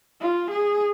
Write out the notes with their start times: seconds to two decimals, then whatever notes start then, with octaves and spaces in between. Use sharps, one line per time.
0.21 F4
0.51 G#4